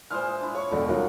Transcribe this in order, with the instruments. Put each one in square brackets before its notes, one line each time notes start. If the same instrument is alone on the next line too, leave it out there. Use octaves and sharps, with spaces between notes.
[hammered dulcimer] A#2 E3 G#3 [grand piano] C5 F6
[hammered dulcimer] G#4
D4 E4
[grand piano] C#5 C#6 [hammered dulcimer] F5
[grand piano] E1 B1 [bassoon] D3 [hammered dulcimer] A3 E4 F#4
[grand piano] D#1 D#4 F4 [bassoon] F#2